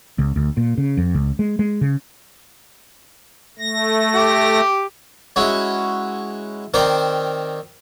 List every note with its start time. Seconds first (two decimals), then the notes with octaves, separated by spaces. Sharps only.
0.19 C#2
0.36 D2
0.57 A#2
0.78 C#3
0.97 F2
1.15 C#2
1.39 G#3
1.59 G#3
1.81 C#3
3.59 A3 A#6
4.15 G4
5.36 G#3 C#4 E4 F#4
6.74 D#3 C4 A#4 C5 D5